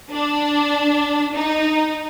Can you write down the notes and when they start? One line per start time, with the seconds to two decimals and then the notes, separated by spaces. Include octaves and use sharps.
0.11 D4
1.36 D#4